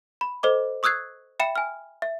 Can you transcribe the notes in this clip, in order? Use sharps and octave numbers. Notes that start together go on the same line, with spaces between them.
B5
A4 C5 D#5 D6
C#6 D#6 E6 F#6 G#6 C7
E5 G5 B5 C#7 E7
G#5 F6
E5